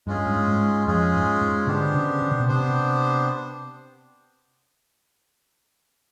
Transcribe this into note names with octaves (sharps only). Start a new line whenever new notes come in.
G2 G#3 C#4 F4 G#4
G#2
G#2
F2 G#3 C#4 F4 G#4
G#2
G#2
D3 B3 D4 G4 C5
C#3
C#3
C3
B2
C3 B3 D4 G4 C5